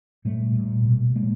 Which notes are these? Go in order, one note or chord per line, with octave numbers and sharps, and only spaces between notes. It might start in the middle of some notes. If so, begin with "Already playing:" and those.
A#2 G3 A3
A#2
B2
A#2 G#3 A#3